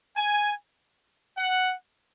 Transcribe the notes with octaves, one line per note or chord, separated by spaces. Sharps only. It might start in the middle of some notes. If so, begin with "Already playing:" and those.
G#5
F#5